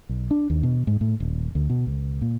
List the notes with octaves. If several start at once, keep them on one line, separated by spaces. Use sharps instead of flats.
B1
D4
D#2
B2
G#2
A2
D#1
D2
B2
C#2
A#2